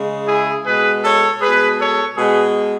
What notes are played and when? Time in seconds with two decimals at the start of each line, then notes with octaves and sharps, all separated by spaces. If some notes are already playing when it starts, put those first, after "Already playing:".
Already playing: C#3 G#3
0.28 E4 G#4
0.65 B2 G#3 G#4 B4
1.03 A4 C#5
1.41 B2 G#3 G#4 B4
1.78 A4 C#5
2.16 B2 G#3 G#4 B4